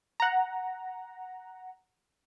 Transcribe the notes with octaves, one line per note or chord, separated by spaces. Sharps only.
F#5 A#5